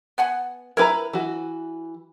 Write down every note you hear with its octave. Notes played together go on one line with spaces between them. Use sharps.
B3 F#5 G#5
E4 A#4 B4 G#5 A#5
E3 F#4